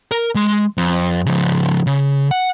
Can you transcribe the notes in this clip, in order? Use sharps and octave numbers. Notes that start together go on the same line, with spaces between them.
A#4
G#3 C6
F2
C#3 F3
C#3
F#5